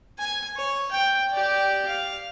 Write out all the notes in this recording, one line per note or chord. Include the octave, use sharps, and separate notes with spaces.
G#5
C#5
G5
G4 D5
F5